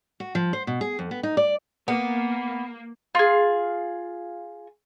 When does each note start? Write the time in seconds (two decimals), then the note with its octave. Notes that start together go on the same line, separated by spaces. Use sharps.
0.20 F#4
0.35 F3
0.53 C5
0.67 B2
0.81 G#4
0.99 F2
1.11 B3
1.23 D#4
1.37 D5
1.88 A#3 B3
3.15 F4 G#4